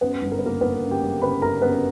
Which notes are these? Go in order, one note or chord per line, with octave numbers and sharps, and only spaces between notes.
F#2 B3 B4
G1
A#4
B4
C#3 A#3 A#4
G1 B3 B4
F#2
G4 G5
G1
C#3 B4 B5
G1 A#4 A#5
F#2 B3 B4